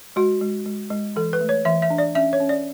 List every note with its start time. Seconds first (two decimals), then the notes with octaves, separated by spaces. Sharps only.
0.16 G#3 F#4
0.41 G#3
0.66 G#3
0.90 G#3
1.16 E3 A4
1.33 B4
1.41 A3
1.49 C#5
1.65 E3 E5
1.82 E5
1.90 D4
1.98 D5
2.15 C#4 E5
2.33 C#5
2.40 C#4
2.49 D5